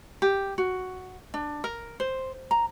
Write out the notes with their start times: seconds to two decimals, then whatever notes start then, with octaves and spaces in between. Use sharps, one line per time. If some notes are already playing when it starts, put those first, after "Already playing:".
0.22 G4
0.58 F#4
1.34 D4
1.64 A#4
2.00 C5
2.51 A#5